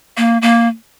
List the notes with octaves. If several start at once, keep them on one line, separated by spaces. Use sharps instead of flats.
A#3
A#3